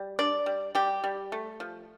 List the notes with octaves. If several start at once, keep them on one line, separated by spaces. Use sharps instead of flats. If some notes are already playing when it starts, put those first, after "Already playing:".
Already playing: G3
D4 D5
G3
G3 G4
G3
A3
F3